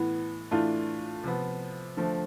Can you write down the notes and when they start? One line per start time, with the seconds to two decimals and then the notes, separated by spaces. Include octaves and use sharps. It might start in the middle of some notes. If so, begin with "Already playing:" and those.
Already playing: A2 E3 B3
0.51 A2 E3 A3 D4 F4
1.24 C3 F3 B3
1.97 D3 F3 A3